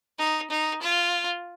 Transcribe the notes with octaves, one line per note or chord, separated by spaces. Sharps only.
D#4
D#4
F4